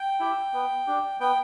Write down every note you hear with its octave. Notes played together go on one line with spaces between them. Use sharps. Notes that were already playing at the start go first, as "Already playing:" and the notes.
Already playing: G5
E4 G4
B3
D4 G4
B3 G5